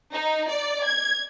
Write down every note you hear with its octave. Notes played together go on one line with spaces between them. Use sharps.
D#4
D5
G#6